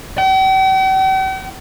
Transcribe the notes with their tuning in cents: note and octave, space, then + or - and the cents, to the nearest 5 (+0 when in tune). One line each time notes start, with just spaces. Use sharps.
G5 -45